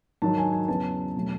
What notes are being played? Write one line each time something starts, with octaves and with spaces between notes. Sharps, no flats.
G#2 D#3 F#3 A5
G#5
G#5
E2 C#3 F#3 B3 A5
B2 F#3 A3 C#4